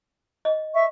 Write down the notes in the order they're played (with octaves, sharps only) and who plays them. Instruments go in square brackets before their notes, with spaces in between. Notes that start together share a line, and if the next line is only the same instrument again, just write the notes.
[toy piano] D#5
[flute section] E5 C#6